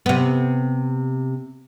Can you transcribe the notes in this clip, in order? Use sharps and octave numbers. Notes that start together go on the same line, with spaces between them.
C3 B3